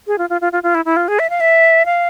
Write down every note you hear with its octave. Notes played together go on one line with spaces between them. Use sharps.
G#4
F4
F4
F4
F4
F4
E4
E4
F4
G#4
E5
F5
E5
F5